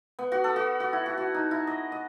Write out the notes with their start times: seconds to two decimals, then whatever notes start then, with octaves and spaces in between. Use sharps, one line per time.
0.19 B3
0.32 F#4
0.44 A4
0.56 F#4
0.80 F#4
0.93 E4
1.06 F#4
1.17 F#4
1.35 D#4
1.51 E4
1.67 D#5
1.92 D#5